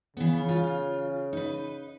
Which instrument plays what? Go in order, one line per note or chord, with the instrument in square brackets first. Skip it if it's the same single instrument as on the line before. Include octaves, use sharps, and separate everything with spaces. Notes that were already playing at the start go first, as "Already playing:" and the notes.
[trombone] C#3 [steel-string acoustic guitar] E3 B3
[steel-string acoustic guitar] F4
D#4 B4